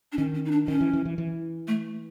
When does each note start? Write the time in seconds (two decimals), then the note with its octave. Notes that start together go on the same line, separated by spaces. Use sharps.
0.12 D4
0.18 D#3 C#4
0.35 C#4
0.45 D#4
0.51 D4
0.68 D#3 C#4
0.81 E3
0.93 E3
1.05 E3
1.18 E3
1.68 A3